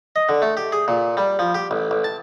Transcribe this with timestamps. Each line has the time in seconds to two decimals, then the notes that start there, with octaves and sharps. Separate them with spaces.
0.16 D#5
0.29 D3
0.42 A3
0.57 G4
0.72 G#4
0.88 A#2
1.17 G3
1.39 F3
1.55 G4
1.71 A1
1.91 A1
2.04 A5